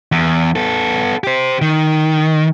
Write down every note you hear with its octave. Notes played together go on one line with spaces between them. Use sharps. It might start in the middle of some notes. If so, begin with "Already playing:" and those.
E2
B3 A4
G4 C5
D#3